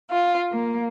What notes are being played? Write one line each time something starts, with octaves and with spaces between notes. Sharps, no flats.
F4
A#3